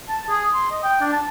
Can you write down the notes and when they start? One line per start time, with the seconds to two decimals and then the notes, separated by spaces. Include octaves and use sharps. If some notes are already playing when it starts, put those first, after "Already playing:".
0.09 A5
0.29 G#4
0.54 C6
0.71 D#5
0.84 G5
1.01 D4
1.13 A5